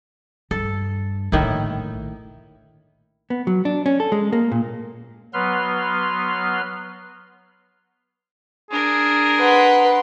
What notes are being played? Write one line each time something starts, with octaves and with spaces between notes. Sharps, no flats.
G2 A4
A#1 A2 D3 D#3 E4
B3
F#3
D4
C#4
A4
G#3
A#3
A#2
F#3 B3 B4 C6 F6
D4 G#4 A#4
B4 F#5 C6